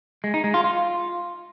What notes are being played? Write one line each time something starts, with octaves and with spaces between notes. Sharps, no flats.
G#3
D#4
G#3
F4
F4